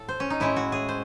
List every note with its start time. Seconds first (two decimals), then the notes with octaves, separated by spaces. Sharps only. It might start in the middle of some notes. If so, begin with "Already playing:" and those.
Already playing: A2 A4
0.09 C5
0.20 C#4
0.30 D#4
0.40 A2 G#3 C#4 E4
0.56 F#4
0.72 G#4
0.89 C5